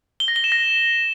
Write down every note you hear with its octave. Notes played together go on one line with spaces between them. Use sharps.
G7
A#6
G7
E7
A#6